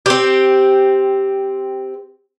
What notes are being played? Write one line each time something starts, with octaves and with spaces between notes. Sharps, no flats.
C4 G4